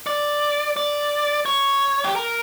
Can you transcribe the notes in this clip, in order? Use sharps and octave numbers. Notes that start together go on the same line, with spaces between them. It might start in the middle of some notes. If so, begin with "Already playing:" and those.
D5
D5
C#5
G4
A#4